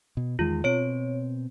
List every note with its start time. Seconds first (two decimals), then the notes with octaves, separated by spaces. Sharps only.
0.17 B2
0.39 E2 D#3 G#3 F4
0.64 B2 C4 C#5 D7